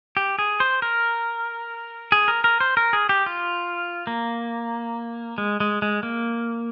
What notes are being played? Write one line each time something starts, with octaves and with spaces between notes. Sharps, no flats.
G4
G#4
C5
A#4
G#4
A#4
A#4
C5
A#4
G#4
G4
F4
A#3
G#3
G#3
G#3
A#3